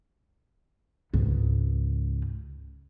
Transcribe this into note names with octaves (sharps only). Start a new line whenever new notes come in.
C#2 G#2